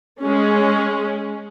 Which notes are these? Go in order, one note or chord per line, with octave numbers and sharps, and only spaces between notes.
G#3 C#4